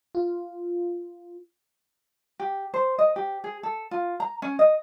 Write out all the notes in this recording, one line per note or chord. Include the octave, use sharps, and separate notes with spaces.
F4
G4
C5
D#5
G4
G#4
A4
F4
A#5
C#4
D#5